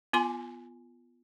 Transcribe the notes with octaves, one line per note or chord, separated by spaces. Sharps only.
B3 F4 G#5 C6